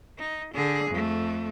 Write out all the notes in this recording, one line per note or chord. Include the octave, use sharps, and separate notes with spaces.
D#4
D3 G#4
F2 A3